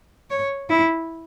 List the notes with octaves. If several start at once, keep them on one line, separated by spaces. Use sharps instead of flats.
C#5
E4